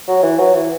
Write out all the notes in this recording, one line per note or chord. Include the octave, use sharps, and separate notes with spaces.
F#3
E3
F#3
E3